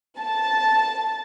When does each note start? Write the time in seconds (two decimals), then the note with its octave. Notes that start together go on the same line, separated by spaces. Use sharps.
0.19 A5